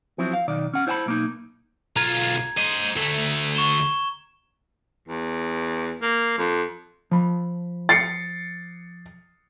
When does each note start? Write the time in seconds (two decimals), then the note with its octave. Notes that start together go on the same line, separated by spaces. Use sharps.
0.18 F3 F#3 C4 E4
0.33 F5
0.48 B1 D#3 D5
0.74 C#4 F#5
0.87 E4 C5 D5 G#5 A5 B5
1.06 B1 A#3 D#4
1.96 B1 F4 A#5 G#6
2.57 C5 D#5
2.96 D2 A3
3.55 C#6 E7 G7
5.08 E2
6.02 A#3
6.38 F2
7.11 F3 B5
7.89 A6 C7 C#7